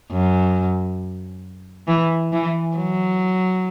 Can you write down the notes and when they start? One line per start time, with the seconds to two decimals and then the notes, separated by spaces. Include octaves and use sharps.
0.12 F#2
1.87 E3
2.32 E3
2.77 F#3